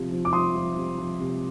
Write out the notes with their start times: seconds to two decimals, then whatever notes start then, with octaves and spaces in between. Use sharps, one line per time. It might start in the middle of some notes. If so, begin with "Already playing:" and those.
Already playing: C3 F3
0.11 F3
0.25 D6
0.33 F3 C6 D#6
0.55 F3
0.77 C3
0.98 F3
1.20 C3